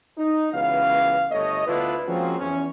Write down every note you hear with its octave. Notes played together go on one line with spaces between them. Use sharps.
D#4
C#2 F#2 E3 B3 F5
G1 A3 C#5 D#5
D2 B3 D4 E4 F4 B4
F3 G#3 A#3 C4 C#4 F#4
E2 C#4